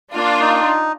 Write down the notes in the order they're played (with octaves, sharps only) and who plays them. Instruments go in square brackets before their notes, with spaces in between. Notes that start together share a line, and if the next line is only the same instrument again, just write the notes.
[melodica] A#3 [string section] D4 F4
[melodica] D#4